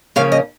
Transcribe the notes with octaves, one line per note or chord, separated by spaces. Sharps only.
C#3 F3 A#3 C#4 F5
D#5